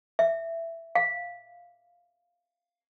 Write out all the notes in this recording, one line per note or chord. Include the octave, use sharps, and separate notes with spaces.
E5
F5